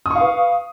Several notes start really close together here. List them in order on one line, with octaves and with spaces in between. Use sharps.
D#6 C#6 F5 B4